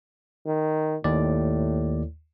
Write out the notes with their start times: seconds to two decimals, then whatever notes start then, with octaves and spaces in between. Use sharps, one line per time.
0.46 D#3
1.04 D#2 A2 D5